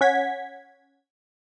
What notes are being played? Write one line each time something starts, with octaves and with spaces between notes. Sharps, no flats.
C#4 F#5 G#6 B6